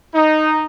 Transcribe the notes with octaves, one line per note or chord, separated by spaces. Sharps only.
D#4